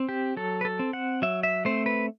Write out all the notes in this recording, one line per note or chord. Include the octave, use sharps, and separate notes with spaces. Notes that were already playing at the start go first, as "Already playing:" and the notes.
Already playing: C4
G4
F#3 A4
B4
A4
C4
F#5
F#3 E5
E5
A3 C4 C5
B4